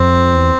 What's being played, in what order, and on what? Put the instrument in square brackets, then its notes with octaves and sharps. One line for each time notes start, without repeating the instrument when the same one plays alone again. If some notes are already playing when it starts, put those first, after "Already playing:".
Already playing: [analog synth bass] F2 [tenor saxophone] C4
[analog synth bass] E2